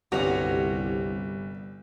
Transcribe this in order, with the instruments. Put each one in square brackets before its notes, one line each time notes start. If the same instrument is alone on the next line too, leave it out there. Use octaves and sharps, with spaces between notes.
[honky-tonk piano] G1 F7 [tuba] C2 [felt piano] G3 [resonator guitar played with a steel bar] F#4 C#5